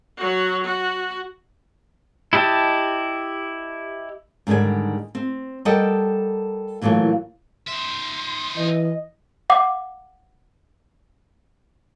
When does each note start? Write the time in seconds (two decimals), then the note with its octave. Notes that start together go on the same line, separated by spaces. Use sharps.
0.17 F#3 F#4
0.64 F#4
2.33 E4 G4 D#5 A5
4.47 G#2 D3 D#3 G3 G#5
5.15 C4
5.65 G3 A4 A#4 D#5 F#5 G5
6.81 A#2 E3 F#3 A3 A#3
7.68 D#4 E5 C6
8.56 E3 D#5
9.50 F5 F#5 D6